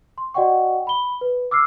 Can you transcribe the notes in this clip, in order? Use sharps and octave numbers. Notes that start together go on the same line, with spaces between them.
C6
F#4 D5 D#5 F#5 G5 C#6
B5 G7
B4
D6 E6 F6 C7